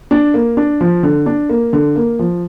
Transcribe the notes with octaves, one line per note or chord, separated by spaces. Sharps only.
D4
A#3
D4
F3
D3
D4
A#3
D3
A#3
F3